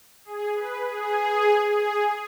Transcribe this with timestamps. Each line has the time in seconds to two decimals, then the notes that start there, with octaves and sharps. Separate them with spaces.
0.25 G#4
0.55 B4
0.86 G#4
1.76 G#4